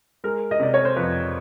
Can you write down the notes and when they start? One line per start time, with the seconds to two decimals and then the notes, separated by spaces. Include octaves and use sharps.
0.24 G#3 A#4
0.51 D#5
0.60 C3 D5
0.74 C#5
0.85 C5
0.96 F2 B4